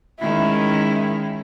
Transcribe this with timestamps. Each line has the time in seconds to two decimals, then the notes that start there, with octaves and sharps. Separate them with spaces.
0.19 D#3 G#3 C#4 E4